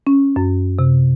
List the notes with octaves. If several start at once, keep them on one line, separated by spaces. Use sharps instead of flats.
C#4
F#2
C3